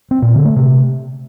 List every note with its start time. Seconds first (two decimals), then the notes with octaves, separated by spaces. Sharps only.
0.11 C4
0.22 A#2
0.34 D3
0.45 A3
0.56 C3